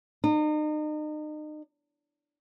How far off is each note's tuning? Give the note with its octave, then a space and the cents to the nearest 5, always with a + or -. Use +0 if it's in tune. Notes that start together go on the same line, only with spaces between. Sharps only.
D#4 -35